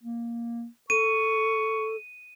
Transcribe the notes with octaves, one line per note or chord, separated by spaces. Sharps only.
A#3
A4 C#6 D#7